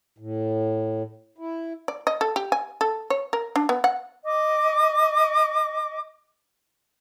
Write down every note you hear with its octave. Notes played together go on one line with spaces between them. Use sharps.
A2
E4
D5
D#5
A4
G4
G#5
A4
C#5
A#4
D4
B3
F#5
D#5 D6